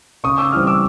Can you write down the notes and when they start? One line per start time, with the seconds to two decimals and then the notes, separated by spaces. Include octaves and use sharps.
0.24 C#3 C#6 D#6
0.38 D6 E6
0.52 E3 G3 C4 D#6 F6
0.67 D6 E6